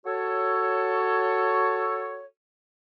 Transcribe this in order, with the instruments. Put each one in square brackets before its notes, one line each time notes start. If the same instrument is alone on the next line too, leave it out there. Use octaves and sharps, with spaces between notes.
[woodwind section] F#4 A4 C#5